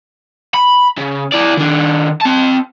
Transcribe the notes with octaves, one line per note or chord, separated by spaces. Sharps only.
B5
C#3
E4 D5
D#3 D4
C4 A5